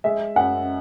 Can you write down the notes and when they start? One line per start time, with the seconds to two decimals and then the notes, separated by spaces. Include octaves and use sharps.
0.04 G#3 E5
0.36 F#2 F#5